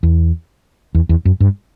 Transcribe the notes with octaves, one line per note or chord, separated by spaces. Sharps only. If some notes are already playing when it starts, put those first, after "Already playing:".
E2
E2
E2
F#2
G2